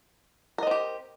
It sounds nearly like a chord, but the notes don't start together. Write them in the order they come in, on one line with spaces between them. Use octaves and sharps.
A#4 D#5 C4 G4